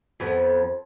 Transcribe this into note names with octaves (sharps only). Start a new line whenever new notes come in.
F2 B3